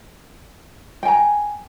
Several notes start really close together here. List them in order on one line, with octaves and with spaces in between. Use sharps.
G5 G#5 A#5